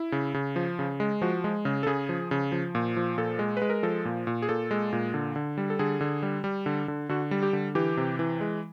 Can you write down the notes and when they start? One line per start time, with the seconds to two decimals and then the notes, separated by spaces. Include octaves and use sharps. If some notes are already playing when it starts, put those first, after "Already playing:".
Already playing: E4
0.12 C#3
0.34 C#3
0.56 F3
0.79 C#3
1.00 G#3
1.22 F3 F#4
1.44 G#3
1.65 C#3
1.83 A4
1.86 C#3 G#4
2.09 F3
2.31 C#3
2.52 F3
2.75 A#2
2.97 F3
3.18 A#2 A4
3.39 G#3
3.57 G#3 B4
3.70 A#4
3.83 F3 A4
4.05 A#2
4.27 A#2
4.42 G#4
4.49 A#2 A4
4.71 G#3
4.93 A#2
5.14 D3
5.36 D3
5.58 G3
5.70 A4
5.79 D3 G#4
6.01 D3
6.23 G3
6.44 G3
6.66 D3
6.88 D3
7.09 D3 F#4
7.31 G3
7.43 G4
7.53 D3
7.75 E3 G4
7.97 C3
8.19 E3
8.41 G#3